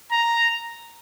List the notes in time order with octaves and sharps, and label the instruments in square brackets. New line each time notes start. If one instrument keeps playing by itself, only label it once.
[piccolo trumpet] A#5